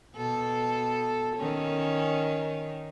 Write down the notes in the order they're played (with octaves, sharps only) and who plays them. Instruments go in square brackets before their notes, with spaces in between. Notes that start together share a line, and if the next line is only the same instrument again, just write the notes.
[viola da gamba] B2 A4
D#3 C#4